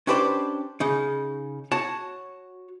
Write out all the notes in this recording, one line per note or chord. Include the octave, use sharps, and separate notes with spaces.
C#4 D4 G4 B4 C5 D5
C#3 D#4
F#4 C#5 A5